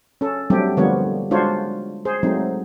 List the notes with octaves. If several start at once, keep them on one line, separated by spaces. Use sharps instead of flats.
C#4 A4
F#3 G3 A3 C4 D4 G4
D3 F3 G3 A#3 B3 C#5
G#3 D4 F4 F#4 C5 C#5
G#4 C5
F#3 G#3 A3 C4 D#4